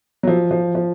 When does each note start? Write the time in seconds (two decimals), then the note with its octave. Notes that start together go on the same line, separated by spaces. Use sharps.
0.23 F#3
0.27 F3
0.51 F3
0.75 F3